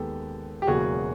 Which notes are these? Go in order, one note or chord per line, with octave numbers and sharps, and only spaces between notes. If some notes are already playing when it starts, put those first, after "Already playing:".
Already playing: D#2 D#3 G#3 B3 G4 A4
G4
E1 E2 C#3 F#3 A#3 F#4 G#4